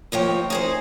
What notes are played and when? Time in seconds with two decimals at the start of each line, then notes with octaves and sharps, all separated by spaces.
0.12 D#2 F3 C#5 G5
0.50 D#4 G#4 C5